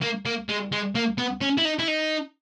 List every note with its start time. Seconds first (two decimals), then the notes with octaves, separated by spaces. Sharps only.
0.02 A#3
0.26 A#3
0.49 G#3
0.72 G#3
0.95 A#3
1.18 B3
1.41 C#4
1.58 E4
1.65 D#4
1.79 E4
1.88 D#4